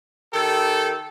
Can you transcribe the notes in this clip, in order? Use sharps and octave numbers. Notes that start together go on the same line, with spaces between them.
D#3 G4 A4